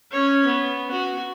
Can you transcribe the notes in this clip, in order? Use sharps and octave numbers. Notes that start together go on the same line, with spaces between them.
C#4 C#5
B3
F#4